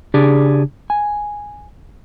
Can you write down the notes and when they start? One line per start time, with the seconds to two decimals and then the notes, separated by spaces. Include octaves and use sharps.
0.14 C#3 D4 G4 G#4 D5
0.90 G#5